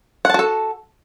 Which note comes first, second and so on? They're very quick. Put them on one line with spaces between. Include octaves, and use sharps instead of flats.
F#5 A5 F#4 A4